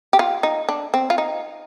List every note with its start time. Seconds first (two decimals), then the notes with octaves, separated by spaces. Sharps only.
0.13 G4
0.19 F4
0.43 D#4
0.69 D4
0.94 C4
1.10 F4
1.18 D#4